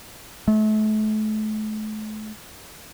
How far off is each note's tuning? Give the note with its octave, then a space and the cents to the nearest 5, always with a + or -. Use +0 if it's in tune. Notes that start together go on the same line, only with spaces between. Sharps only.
A3 -35